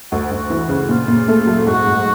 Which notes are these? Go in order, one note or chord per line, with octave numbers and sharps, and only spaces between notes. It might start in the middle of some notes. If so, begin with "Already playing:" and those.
D2 F#4
D2
E3
C#3
A#2 F4
A#2
A3
F#3
G#2 F#4
G#2